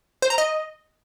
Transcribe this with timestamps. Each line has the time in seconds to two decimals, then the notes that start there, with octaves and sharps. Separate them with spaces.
0.22 C5
0.30 A#5
0.38 D#5